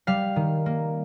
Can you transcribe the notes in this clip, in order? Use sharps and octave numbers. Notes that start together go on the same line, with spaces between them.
G3 F5
D#3
A#3